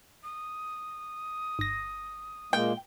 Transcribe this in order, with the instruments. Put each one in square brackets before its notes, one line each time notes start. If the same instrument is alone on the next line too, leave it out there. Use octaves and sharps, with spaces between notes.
[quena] D#6
[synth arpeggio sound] G1 A#6
[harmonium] A#2 G#3 A#3 [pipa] G5